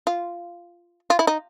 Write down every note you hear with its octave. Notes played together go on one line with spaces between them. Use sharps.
F4
F4
E4
D#4